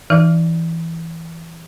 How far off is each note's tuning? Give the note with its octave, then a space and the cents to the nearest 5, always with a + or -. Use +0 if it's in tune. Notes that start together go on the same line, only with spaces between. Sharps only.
E3 +0 D#4 +0 E5 +45